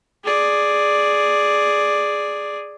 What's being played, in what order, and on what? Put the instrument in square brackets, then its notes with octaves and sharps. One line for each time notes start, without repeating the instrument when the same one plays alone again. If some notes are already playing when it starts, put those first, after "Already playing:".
[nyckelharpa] G#4 D5